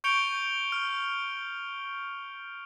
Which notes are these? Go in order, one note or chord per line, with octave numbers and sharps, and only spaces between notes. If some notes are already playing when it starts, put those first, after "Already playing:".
C#6 G6 C#7 D7 F7 G7
F6